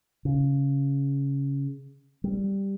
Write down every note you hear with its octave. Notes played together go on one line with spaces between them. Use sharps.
C#3
G3